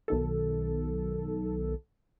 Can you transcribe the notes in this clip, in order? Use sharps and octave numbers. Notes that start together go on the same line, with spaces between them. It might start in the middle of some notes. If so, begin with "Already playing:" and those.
B1 D#3 A4